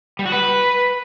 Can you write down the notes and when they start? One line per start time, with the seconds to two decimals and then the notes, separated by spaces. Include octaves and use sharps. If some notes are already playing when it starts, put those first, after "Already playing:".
0.19 G3
0.26 F#4
0.32 B4